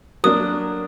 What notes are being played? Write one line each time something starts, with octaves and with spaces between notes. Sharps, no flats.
F#3 A#3 D4 D#6